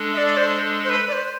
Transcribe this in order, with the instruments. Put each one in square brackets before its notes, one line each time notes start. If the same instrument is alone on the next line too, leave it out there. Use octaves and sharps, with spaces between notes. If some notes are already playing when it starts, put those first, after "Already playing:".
Already playing: [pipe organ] G#3 D4 A4
[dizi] E5
D5
C5
C5
B4
D5
C5